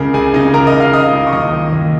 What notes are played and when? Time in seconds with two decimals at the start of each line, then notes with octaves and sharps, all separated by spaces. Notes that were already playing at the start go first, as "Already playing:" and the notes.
Already playing: C#2 C#3 A#4
0.14 C#2 G#4 G#5
0.34 C#3 D#4 D#5
0.54 C#2 A#4 A#5
0.67 D#5 D#6
0.74 C#2
0.80 F5 F6
0.93 C#2 D#5 D#6
1.13 C#2
1.27 C#6
1.33 D#2 D#5 D#6
1.53 D#3
1.73 D#2